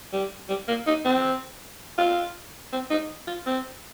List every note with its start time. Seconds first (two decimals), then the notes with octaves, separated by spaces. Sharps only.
0.13 G3
0.49 G3
0.68 A#3
0.87 D#4
1.05 C4
1.98 F4
2.72 C4
2.90 D#4
3.27 F4
3.46 C4